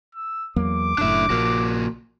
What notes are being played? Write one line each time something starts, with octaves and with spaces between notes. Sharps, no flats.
E6
E2 F#3 A#3 D6
F#1 F#2 A2 D4 E5
A#1 A#2 A#3 F#4